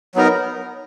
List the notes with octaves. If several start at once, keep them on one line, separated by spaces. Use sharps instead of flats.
F#3 B3 D#4 A#4